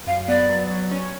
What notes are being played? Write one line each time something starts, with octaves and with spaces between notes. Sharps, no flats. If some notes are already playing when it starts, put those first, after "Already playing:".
F#2 F5
B3 D5
F#3
F#3
C#4